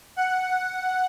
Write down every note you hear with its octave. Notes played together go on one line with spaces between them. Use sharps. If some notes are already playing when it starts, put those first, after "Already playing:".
F#5